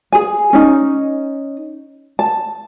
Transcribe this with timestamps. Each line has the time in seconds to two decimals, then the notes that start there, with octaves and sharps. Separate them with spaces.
0.12 G#4 G#5
0.53 C#4 D#4
2.19 A5